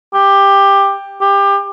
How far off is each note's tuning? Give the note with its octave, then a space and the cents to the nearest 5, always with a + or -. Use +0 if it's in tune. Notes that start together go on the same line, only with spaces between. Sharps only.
G4 +15
G4 +25